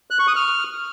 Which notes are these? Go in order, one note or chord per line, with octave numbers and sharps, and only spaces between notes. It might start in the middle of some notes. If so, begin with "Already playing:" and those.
F#6
C#6
D#6
F6